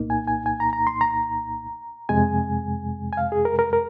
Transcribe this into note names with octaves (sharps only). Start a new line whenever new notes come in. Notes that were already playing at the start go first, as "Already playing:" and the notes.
Already playing: C2 A#2 A#3 D#4
G#5
G#5
G#5
A#5
A#5
C6
A#5
F2 C3 G#3 G#5
G#5
F5
G#4
A#4
A#4
A#4